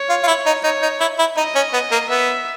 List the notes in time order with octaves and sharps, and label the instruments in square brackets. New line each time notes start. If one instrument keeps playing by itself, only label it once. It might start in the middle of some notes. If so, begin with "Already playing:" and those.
Already playing: [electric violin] C#5
[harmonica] F4
F4
E4
D#4
[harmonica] D#4 [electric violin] C#5
[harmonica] D#4
E4
E4
[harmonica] D#4 [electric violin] D#5
[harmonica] C#4
B3
A#3
[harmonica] B3 [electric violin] E5